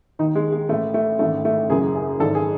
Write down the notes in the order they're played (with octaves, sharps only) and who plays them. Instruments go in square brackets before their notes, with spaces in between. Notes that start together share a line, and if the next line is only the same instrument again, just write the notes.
[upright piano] D#2 D#3 D#4
G#3
G#3
A1 A2 E3 A3
A3
A1 G#2 D#3 A3
A3
F#1 F#2 C#3 E3 G#4
G#4
G#1 G#2 E3 A4
G#4